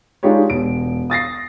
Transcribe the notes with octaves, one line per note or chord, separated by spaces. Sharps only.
G#3 D4 D#4 F4 G4 C#5
E1 D7
D#6 A6 A#6 C7